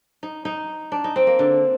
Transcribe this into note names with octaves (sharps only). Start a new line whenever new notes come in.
D#4
D#4
D4
D#4
C4
A#3
D3